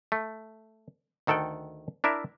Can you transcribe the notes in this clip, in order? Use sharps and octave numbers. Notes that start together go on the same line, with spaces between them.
A3
D2 D#3 A4 F#5 G5
D4 E4 A#4 E5